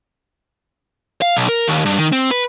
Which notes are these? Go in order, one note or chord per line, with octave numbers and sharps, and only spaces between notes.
F5
B1
A#4
D#2
G2
D#3
C4
B4